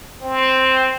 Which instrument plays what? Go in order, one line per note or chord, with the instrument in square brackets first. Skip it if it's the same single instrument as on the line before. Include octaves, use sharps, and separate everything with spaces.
[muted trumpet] C4